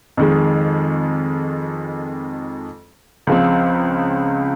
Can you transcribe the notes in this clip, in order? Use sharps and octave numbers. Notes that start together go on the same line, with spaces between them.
F2 D#3 G#3
C#2 C#3 F3 C4